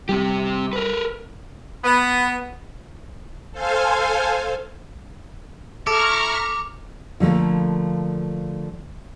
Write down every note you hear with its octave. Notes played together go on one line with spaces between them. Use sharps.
C3 G3 G4
A#4 B4
B3
A4 C5 F5 G#5
E4 A4 A#5 C#6 D6 F6
D3 F3 A3 A#3